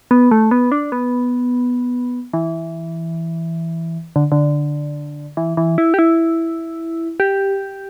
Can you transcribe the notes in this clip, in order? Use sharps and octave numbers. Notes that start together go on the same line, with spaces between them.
B3
A3
B3
D4
B3
E3
D3
D3
E3
E3
E4
G4
E4
G4